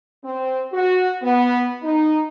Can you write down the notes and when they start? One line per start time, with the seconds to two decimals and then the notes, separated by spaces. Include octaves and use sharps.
0.24 C4
0.72 F#4
1.22 B3
1.82 D#4